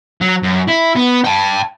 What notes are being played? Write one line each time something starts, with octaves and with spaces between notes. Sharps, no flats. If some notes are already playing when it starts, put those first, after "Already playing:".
F#3
F#2
E4
B3
G5 A5